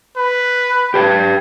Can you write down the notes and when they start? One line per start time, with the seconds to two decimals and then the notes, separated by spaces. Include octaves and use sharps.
0.17 B4
0.94 G4 B4 G5